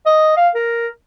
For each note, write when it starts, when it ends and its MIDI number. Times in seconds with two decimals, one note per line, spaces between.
0.06 0.36 75
0.37 0.48 77
0.55 0.87 70